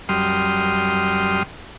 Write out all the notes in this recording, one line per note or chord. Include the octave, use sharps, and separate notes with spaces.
F#2 G3 C6 D#6 F6